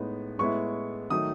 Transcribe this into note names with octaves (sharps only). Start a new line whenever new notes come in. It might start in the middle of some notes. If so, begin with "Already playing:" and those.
Already playing: A2 G#3 B3 D#4
A2 G#3 B3 E4 C#6
D#3 F#3 A3 D#4 D#6